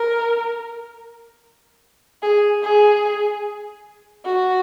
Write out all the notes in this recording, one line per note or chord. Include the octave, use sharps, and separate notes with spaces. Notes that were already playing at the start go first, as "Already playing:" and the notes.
Already playing: A#4
G#4
G#4
F#4